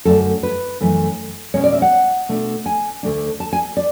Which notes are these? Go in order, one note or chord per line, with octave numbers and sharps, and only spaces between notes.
F#2 D3 A3 D4 A4
B4
F#2 E3 A3
B2 G#3 C#4 C#5
D5
E5
F#5
B2 A3 D4
G#5
D2 D3 A3 D4
A5
G#5
D5